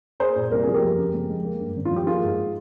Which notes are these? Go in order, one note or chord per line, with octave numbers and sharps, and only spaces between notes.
A#3 G#4 C5
A#2
C2 A#4
F3 G#4
G4 A#4
F2
C#3
F2
G#3
A#3
G2
G#1
F4
F3
G4
A#3 F4 G#4
G#2